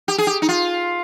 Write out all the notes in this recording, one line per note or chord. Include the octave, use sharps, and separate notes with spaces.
G4
G#4
G4
D#4
F4